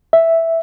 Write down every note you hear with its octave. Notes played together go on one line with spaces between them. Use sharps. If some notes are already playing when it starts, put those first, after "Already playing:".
E5